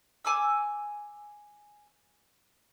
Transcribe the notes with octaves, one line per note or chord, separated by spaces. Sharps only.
G#5 D6 E6